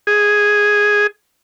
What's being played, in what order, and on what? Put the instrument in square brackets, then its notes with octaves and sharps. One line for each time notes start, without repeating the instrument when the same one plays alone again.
[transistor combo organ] G#4